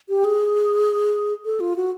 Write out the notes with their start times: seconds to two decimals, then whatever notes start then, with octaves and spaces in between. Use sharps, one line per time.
0.09 G4
0.24 G#4
1.45 A4
1.60 F4
1.76 F#4